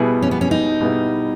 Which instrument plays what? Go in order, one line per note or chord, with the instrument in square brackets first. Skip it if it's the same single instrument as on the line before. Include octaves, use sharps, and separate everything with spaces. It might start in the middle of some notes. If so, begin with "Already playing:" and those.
Already playing: [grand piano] B2 G3 B3 E4 G#4
[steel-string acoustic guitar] C#4
B3
C#4
D#4
[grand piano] B2 G3 B3 E4 G#4